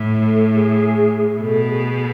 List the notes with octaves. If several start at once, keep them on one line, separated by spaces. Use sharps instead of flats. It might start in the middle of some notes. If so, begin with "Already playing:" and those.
Already playing: A2
A4
G#4
B2 A4
G#4